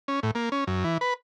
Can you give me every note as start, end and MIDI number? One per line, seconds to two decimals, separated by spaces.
0.08 0.20 61
0.23 0.31 45
0.35 0.49 58
0.52 0.64 61
0.67 0.84 42
0.84 0.98 52
1.01 1.14 71